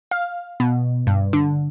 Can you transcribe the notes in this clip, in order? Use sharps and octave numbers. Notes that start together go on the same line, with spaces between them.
F5
B2
G2
D3